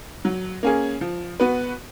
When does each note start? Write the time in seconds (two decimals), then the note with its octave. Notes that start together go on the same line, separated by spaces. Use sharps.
0.25 F#3
0.63 A#3 C#4 G#4
1.01 F3
1.40 B3 F#4 B4